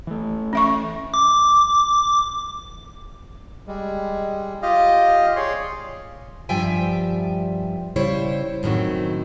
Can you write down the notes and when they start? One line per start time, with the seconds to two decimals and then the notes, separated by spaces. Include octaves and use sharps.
0.07 E3 A3
0.53 C#4 E5 C#6
1.14 D6
3.68 G3 G#3
4.62 F4 G4 D#5 F5
5.36 G#4 C#5 D5 C6
6.49 G2 F3 G3 E5 G5 G#5
7.96 C#3 G3 E4 C5 C#5
8.63 F#2 A2 D#3 C4 F#4